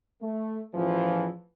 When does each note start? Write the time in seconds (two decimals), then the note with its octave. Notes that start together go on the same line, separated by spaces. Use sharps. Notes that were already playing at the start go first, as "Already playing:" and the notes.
0.22 A3
0.74 A1 E2 E3 F3